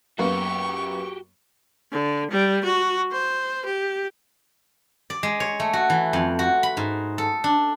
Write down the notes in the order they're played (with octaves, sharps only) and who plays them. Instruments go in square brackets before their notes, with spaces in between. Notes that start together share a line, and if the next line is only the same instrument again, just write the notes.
[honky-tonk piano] F#2 A#3 B3 [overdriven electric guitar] F#4 G4 [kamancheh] C#6
[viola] D3
G3
F#4
C5
G4
[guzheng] D5
G#3
C#5
A3
F#4
E3
F2
F#4
B5
G#2
A4
D4